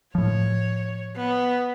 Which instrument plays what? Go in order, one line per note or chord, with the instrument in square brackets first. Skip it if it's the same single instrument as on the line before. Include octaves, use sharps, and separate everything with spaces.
[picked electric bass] A2 F3 [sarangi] C#5
[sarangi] B3